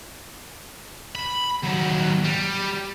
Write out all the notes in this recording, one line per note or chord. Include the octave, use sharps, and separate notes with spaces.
B5
D#2 F#3
G3